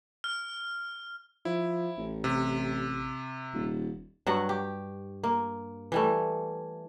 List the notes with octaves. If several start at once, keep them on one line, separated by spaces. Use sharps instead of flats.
F6
F3 E4
A1
C3
D#1
G2 F#3 F#5
G4
A#3
E3 G3 A3